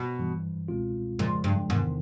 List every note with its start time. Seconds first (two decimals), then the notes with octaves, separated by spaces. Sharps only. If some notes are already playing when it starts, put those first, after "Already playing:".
Already playing: B2
0.19 G2 E3 G3
0.68 C#2 B2 G#3 C4 F4
1.19 F2 A#2 C#3 F3 G#3
1.44 G2
1.69 E2 G#2 C3 D#3